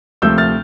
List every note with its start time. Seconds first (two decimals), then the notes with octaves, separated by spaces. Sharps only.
0.22 D2 C3 F3 A3 E6 G6
0.38 F6 A6